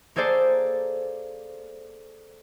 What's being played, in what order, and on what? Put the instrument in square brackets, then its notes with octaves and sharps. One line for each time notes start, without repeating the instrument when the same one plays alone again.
[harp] A#3 G#4 A4 C5 D5